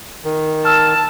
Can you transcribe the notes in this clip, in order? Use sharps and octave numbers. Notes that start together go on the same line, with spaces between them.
D#3
A5 E6 F6